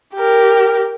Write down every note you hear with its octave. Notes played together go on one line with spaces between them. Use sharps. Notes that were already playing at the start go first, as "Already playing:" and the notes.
G4 A#4